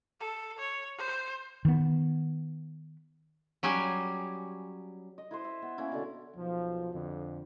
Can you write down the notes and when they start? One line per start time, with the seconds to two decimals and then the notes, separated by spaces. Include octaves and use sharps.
0.20 A4
0.59 C#5
0.98 C5
1.65 D#3 B3
3.63 F#3 G3 C#4 G4 G#4
5.18 D#5
5.31 E4 B4 C5
5.44 E5
5.62 B3
5.78 A#3 C#4 E4
5.91 B2 D3
6.36 B1 F3
6.93 F2 D3